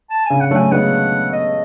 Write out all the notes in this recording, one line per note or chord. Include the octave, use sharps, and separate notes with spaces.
A5
C#3 G#5
F#5
F#3 A3
G#5
G#3 B3 F#5
D#5